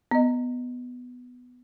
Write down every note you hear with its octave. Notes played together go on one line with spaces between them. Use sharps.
B3 D#5